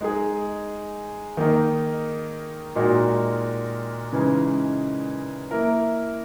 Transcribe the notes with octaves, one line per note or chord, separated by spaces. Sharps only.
G#3 D#4 G#4
D#3 A#3 D#4
A#2 G#3 D#4 F#4 A#4
C#3 E3 G#3 D#4
A#3 E4 A#4